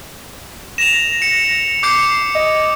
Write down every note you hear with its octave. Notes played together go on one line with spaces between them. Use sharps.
A#6 E7 F7
C#7
D6 G6 C7 C#7
D#5